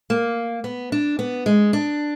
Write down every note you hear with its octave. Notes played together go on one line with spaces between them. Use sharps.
A#3
B3
D4
B3
G#3
D4